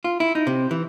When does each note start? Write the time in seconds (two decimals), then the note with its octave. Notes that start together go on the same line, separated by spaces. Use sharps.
0.04 F4
0.20 E4
0.35 D#4
0.47 C3
0.71 E3